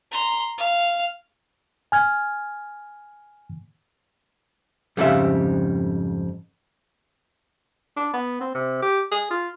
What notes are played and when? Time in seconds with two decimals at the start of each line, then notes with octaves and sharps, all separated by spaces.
0.11 A#5 C6
0.58 F5
1.92 G#5 F6 G#6
4.97 F2 G#2 C#3 G3 C4 E5
7.96 D4
8.14 B3
8.41 C4
8.55 C3
8.82 G4
9.11 G#4
9.31 F4